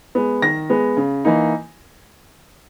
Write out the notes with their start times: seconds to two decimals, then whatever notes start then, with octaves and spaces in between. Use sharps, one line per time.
0.15 G#3 B3
0.42 D#3 A#6
0.70 G#3 B3
0.97 C#3
1.25 E3 A#3 D#4